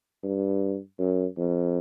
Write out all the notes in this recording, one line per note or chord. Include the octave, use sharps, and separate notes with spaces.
G2
F#2
F2